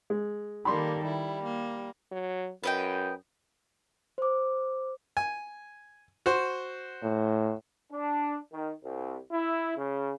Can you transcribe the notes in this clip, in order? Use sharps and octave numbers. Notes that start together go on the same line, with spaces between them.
G#3
D#3 G3 A#3 A4 B5 C6
G3 E4
A#3
F#3
F#2 B4 D#5 G5
C5 D6
G#5
F#4 C5
A2
D4
D#3
C2
E4
C#3